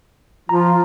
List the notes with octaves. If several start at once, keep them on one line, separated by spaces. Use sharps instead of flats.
F3 F4 A#5